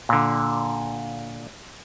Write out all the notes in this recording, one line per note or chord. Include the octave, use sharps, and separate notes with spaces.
A#2 D3